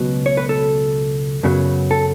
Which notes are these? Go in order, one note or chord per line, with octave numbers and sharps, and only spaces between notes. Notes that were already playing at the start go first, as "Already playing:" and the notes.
Already playing: C#2 B2 F#3 B4
C#5
B4
A4
F#2 C#3 F#3 B3
A4